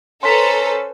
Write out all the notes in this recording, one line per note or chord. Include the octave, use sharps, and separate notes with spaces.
C#4 A4 B4 C5 A#5 C6 B6